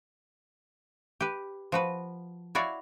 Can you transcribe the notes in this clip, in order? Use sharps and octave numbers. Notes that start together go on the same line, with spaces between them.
G4 B4
F3 F#4 B4
E4 F#4 C#5 D5 F5